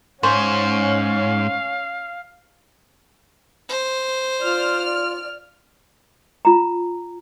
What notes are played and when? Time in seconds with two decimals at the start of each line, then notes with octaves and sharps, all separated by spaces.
0.23 G#2 C#4 C5 C#5 F5
3.69 C5
4.42 F4 D5 F6
6.45 F4 A#5